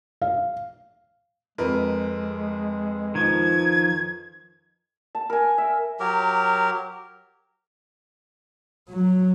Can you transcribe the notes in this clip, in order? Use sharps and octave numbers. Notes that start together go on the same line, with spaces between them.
F5
F2 G#3 A#4 B4
D#3 F3 G#6
A5
A#4 G#5
E5
F#3 G4 A#4
F#3